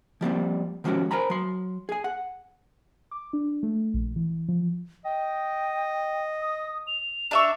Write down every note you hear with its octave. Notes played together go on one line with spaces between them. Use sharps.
F3 G3 A#3 C4
D#3 F3 G#3 C#4 F#4 G4
A#4 C5 G#5 A#5 B5
F#3 C6
G#4 G#5
F#5
D6
D4
A3
A#1
E3
F3
D#5 G5
D#6
F7
D4 E5 C#6